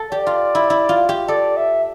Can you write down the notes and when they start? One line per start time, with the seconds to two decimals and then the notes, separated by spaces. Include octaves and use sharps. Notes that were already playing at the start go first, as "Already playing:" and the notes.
Already playing: A4
0.12 G4 D5
0.27 F4
0.55 E4
0.70 E4
0.89 F4
1.09 G4
1.28 A4 D5
1.57 E5